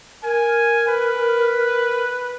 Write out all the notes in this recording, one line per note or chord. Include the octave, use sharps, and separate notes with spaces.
A#4 G#5
B4